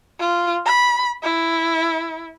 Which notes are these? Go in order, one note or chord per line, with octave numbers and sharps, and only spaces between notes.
F4
B5
E4